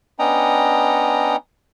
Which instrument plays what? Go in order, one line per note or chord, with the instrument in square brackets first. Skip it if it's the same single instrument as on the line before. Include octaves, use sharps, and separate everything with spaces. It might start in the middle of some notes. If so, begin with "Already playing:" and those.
[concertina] B3 C#4 D4 D#5 G5 A#5